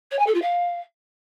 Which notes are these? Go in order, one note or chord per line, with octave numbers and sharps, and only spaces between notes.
C#5
G#5
A4
F4
F5